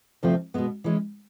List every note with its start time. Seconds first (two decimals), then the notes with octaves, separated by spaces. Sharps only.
0.23 D2 C3 F3 A3 C4
0.54 B2 G#3 B3
0.84 E3 G#3 C#4